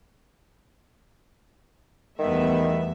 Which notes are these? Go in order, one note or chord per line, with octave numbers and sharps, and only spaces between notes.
E2 D#3 G3 A3 B3 E5